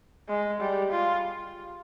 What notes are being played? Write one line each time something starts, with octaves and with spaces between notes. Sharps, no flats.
G#3
G3
F4